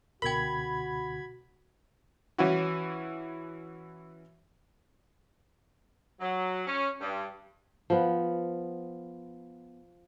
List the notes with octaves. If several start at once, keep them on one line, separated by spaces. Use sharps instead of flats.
C#2 B2 D3 F#4 A#4 G5 B5 G#6
E3 C#4 E4 F#4
F#3
C#4
G2
F3 B3